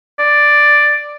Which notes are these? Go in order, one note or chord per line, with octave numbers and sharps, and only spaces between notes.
D5